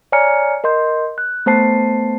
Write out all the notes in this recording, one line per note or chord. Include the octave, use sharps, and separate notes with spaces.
C#5 D5 G#5 A#5 F6 C#7
A#4 D#5 C6 G6
F#6
A3 B3 C5 A5 C7